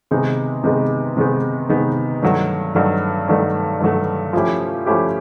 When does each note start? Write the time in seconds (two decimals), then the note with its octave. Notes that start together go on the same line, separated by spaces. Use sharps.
0.11 C3 D#3 G#3 B3 D#4
0.64 C3 D#3 G#3 B3 D#4
1.17 C3 D#3 G#3 B3 D#4
1.69 C3 D#3 G#3 B3 D#4
2.22 G2 D#3 F#3 A3
2.75 G2 D#3 F#3 A3
3.28 G2 D#3 F#3 A3
3.80 G2 D#3 F#3 A3
4.33 F3 A3 C#4 E4 G4
4.86 F3 A3 C#4 E4 G4